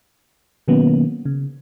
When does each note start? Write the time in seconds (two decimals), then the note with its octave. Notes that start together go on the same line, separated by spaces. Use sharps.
0.68 B2 D#3 F#3 A#3 B3 C#4
1.25 C#3